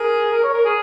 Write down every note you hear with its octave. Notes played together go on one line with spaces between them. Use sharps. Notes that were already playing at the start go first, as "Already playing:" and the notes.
Already playing: G#4 A#4
A#4
C#5
A#4
G#4